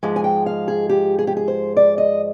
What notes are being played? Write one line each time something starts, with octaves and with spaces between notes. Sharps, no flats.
G#2 F3 G#3
G#5
G5
F5
G#4
G4
G#4
G4
G#4
C5
D5
D#5